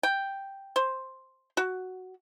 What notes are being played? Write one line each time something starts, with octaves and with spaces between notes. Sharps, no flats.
G5
C5
F#4